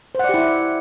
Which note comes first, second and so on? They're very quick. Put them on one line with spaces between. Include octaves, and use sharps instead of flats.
C5 F#5 D5 G4 E4